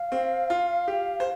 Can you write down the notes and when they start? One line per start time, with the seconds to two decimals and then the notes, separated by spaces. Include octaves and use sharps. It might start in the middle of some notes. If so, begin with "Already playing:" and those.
Already playing: F5
0.12 C4
0.50 F4
0.88 G4
1.20 C5